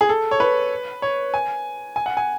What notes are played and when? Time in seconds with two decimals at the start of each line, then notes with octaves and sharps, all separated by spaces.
0.01 G#4
0.09 A4
0.31 C#5
0.40 B4
1.02 C#5
1.34 G#5
1.96 G#5
2.06 F#5
2.17 G#5